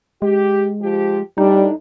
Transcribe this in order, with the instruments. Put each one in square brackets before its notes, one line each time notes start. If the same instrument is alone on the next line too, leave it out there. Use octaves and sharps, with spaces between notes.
[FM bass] G#3 [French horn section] G4
[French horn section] F3 G4
[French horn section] A2 D4 [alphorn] G3 [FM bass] D#4